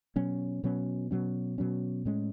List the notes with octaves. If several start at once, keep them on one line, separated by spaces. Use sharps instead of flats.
B2 F#3 C#4
B2 F#3 C#4
B2 F#3 C#4
B2 F#3 C#4
A2 G#3 C#4